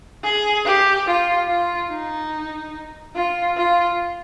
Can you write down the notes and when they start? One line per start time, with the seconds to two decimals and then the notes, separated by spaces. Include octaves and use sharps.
0.24 G#4
0.65 G4
1.06 F4
1.49 F4
1.90 D#4
3.15 F4
3.57 F4